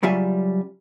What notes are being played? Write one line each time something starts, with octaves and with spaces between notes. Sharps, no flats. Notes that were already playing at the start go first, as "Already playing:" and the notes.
C#3 F#3 G3 F4 E5 G#5